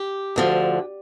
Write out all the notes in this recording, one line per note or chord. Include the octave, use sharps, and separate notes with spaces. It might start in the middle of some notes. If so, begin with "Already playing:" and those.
Already playing: G4
D2 D3 F3